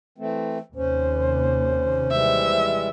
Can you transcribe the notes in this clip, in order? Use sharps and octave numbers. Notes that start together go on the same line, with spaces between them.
E3 A3 C4
D#2 C3 C#4 C5
E3 G3 G#3 E5